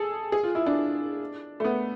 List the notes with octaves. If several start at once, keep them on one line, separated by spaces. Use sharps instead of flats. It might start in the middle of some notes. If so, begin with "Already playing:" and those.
Already playing: G#4 A4
G#4
F4
E4
D4
A3
B3